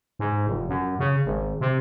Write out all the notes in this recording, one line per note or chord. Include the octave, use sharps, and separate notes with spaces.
G#2
F1
F#2
C#3
G#1
C3